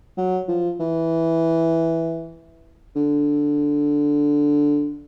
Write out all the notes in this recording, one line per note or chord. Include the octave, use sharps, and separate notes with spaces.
F#3
F3
E3
D3